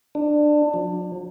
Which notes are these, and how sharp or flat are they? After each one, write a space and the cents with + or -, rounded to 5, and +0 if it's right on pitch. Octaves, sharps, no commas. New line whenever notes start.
D4 +20
F#3 -45